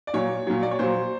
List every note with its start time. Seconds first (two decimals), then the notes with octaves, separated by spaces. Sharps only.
0.07 D5
0.14 A#2 F#3 C#5
0.47 A#2 F#3
0.63 D5
0.71 C#5
0.79 A#2 F#3 C5